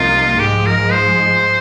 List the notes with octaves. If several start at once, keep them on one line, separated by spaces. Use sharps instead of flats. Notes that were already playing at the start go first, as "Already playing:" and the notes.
Already playing: C2 C3 F3 A#3 D#4 F4
G#2 F3 G#3 G4
A#4
C5